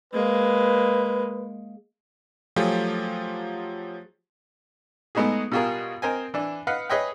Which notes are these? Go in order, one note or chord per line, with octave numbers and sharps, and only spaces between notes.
G#3 A#3 B4
F3 F#3 A3 F4 G4 G#4
G#3 A3 B3 D#4 F#4 G#4
B2 G3 F4 F#4 G#4 A#4
C4 A#4 C5 D#5 G#5
E3 D4
B4 D#5 F5 F#5
G#4 B4 C#5 D#5 E5 G5